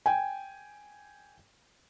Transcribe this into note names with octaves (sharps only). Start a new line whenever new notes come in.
G5 G#5